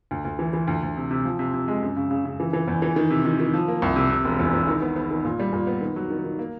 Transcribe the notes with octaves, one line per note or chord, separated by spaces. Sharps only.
D2
D2
E3
E3
D2
D2
C3
C3
F3
C3
C3
G#3
F#2
C#3
C#3
C#3
E3
E3
E2
E3
D#3
C3
D#3
D#3
F3
A#3
C2
C3
C3
E1
E2
E2
D#3
B3
B3
D#3
A#2
G3
A#2
B3
D#3
F#3
D#3
D#3
A#3